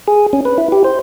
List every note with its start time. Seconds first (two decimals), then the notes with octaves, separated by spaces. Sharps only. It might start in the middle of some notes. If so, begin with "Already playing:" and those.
0.08 G#4
0.33 C#4
0.45 B4
0.58 E4
0.72 G4
0.84 C5